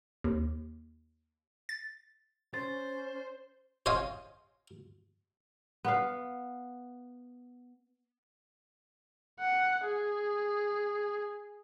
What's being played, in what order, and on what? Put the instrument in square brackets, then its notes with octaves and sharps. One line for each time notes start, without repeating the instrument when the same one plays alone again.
[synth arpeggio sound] D#2
A6
[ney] C#4 [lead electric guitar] C5 [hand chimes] A6
[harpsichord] C5 C#5 D#5 F5 G#5
[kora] B3 F5
[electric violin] F#5
G#4